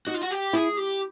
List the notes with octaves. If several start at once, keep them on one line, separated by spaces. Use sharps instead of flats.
D#4 F#4
F4
F#4
G4
E4 G#4
G4